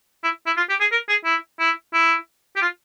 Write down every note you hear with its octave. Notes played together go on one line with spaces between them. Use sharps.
E4
E4
F4
G4
G#4
A#4
G#4
E4
E4
E4
G4
F4